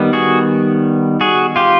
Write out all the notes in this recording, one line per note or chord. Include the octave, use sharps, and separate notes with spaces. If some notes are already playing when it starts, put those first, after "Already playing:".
Already playing: D#3 G3 B3
F#4 G#4
F#4 G#4
F4 G4